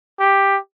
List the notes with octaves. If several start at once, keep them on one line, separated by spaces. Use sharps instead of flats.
G4